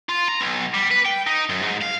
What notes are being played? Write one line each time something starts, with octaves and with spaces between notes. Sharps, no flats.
F4
A#5
B1
G3
B4
G5
D#4
F#2
G#2
F5